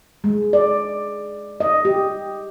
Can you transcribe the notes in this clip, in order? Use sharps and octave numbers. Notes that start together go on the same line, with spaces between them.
G#3
D5
D#5
G4